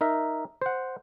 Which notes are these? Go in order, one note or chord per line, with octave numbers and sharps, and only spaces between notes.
D#4 A#4 E5
C5 F#5